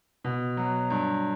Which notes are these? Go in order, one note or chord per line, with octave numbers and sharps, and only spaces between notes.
B2
F#3
G2